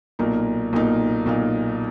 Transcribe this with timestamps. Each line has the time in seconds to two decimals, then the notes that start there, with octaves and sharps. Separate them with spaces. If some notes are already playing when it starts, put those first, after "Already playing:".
0.19 B1 A#2 A#3 D#4
0.73 B1 A#2 A#3 D#4
1.26 B1 A#2 A#3 D#4